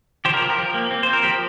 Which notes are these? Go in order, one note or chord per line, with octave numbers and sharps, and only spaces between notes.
F3 G4 C5
A#4
F3 G4
A#4
F3 G4
A#3
C4
C4 C5
A#4
F3 G4